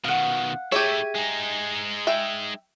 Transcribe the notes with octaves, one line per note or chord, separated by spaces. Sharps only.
B2 D#3 F5 F#5
A3 E4 G4 G#4 C#5 E5 G#6 D#7
G#3 D#4 G#5
E5 G5